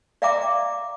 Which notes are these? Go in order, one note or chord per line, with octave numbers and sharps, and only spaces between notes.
D5 E5 F5 G5 A#5 D6